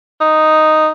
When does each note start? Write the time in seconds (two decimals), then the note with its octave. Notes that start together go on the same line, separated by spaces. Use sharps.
0.21 D#4